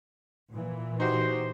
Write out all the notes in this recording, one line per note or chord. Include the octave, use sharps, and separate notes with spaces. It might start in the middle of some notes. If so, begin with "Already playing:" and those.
A#2 E3
D#4 F#4 G4 C5